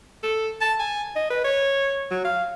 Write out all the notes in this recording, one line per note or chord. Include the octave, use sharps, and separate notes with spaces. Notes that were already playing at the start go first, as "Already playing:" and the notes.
A4
A5
G#5
D#5
B4
C#5
F#3
F5